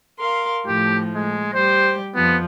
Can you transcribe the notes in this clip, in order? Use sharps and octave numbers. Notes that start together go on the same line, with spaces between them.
A#4 F5 C6
A2 F3 G4
G#3
G3 G4 C5
F2 F3 B3